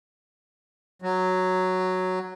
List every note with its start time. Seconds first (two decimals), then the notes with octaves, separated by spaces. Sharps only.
1.02 F#3